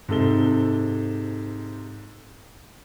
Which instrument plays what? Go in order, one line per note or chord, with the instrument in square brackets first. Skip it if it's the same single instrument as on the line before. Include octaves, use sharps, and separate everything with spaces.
[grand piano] G#2 C3 A4 G7